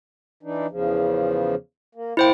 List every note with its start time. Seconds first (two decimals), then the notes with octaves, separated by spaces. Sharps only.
0.43 E3 D4 D#4
0.70 E2 C#3 F3
1.95 A#3
2.17 A#3 E4 C5 G5